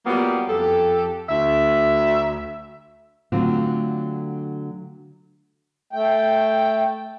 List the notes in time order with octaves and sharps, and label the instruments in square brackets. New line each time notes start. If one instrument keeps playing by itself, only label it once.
[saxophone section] F#3 G3 A#3 B3 F4
F2 G4 A4
D2 E5
[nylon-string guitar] D3 F#3 A3 C4 D4 F4
[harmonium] A3 G5